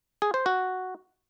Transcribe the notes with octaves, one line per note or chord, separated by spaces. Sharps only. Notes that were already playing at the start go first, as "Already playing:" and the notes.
G#4
C5
F#4